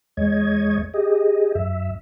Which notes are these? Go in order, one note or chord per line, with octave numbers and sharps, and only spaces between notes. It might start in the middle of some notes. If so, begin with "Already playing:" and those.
E2 G#3 C#5 D#5 G#6
G4 G#4 D#5
F#2 E5